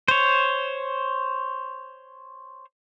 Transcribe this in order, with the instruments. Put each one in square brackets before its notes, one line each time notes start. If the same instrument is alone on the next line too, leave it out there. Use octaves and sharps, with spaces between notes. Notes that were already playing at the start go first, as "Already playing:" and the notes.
[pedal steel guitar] C5 C#5